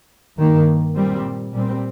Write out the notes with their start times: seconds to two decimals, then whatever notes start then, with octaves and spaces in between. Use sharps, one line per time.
0.38 G2 D#3 A#3
0.96 A#2 G3 C4
1.53 A#2 G3 C4